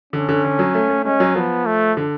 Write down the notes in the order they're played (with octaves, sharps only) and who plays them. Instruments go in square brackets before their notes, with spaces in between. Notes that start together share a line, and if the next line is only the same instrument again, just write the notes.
[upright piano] D3 [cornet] C#4
[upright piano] D3
D3
F#3
A3
A3
[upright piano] G#3 [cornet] C#4
[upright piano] F#3
[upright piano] F3 [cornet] B3
[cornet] A3
[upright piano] D3